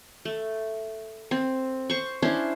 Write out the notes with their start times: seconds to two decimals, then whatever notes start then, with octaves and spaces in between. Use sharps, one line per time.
0.25 A3
1.31 C4
1.90 C5 C#6
2.22 C#4 D4 E4 C5